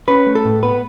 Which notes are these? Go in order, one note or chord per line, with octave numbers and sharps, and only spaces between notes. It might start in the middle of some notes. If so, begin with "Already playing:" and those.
C#4 B4
A3
A4
A2
B3 B4